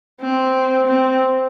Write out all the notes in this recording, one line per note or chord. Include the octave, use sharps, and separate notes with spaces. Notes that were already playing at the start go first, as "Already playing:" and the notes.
C4
C4